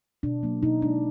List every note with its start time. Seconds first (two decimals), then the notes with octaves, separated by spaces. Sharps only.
0.23 B2 D4
0.43 F#3 A#3
0.62 B2 D#4
0.82 G#3 D4